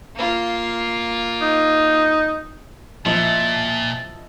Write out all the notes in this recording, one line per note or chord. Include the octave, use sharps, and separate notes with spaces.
A#3 F4
D#4
A#2 F3 E4 D#5 A5